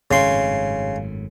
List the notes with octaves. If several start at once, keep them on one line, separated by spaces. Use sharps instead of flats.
G#1 F#2 A2 C#3 C6